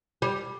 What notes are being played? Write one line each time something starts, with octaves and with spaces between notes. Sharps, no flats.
G3